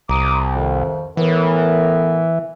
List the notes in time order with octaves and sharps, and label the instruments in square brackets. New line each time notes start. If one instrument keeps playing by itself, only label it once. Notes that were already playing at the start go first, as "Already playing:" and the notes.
[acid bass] C2 [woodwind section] A#5 D6 D#6
[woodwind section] F2 D#3
[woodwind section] A2 B3 A#4 [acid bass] E3